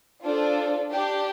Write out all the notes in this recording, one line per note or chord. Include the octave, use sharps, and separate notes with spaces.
D4 F4 A4 C5
D4 G4